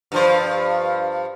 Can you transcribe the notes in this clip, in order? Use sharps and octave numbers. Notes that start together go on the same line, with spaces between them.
G2 F3 C5